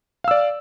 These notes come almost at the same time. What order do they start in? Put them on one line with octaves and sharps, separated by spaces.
F5 E6 D5